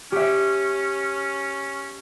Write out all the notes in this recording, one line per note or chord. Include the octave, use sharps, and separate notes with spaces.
C#4 G4 E5